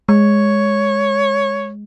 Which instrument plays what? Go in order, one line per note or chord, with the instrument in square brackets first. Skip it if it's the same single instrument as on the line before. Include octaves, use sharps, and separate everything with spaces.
[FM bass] G#3 [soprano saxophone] C#5